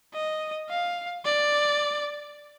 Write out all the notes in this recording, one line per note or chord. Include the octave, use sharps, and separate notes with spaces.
D#5
F5
D5